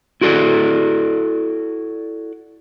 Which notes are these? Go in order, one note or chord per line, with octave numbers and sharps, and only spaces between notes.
E4 F#4 A4 D5